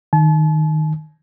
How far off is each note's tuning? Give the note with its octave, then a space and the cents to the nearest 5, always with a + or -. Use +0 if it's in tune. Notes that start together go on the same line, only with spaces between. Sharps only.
D#3 -5 A5 -40